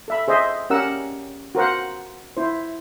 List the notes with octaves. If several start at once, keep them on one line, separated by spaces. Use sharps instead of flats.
A4 E5 B5
G#4 C5 D#5 E5
C#4 G4 A#4 F#5 E6
F#4 A#4 C5 F#5
E4 C5